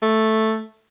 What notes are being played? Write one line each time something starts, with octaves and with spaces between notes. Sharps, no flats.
A3